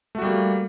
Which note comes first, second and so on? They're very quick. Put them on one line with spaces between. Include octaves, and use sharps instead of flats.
A3 F#4 G3 A#3